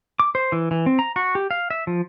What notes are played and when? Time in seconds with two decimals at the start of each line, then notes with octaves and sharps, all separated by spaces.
0.20 D6
0.35 C5
0.52 E3
0.71 E3
0.86 C4
0.99 A#5
1.16 F#4
1.35 G4
1.51 F5
1.71 E5
1.87 F3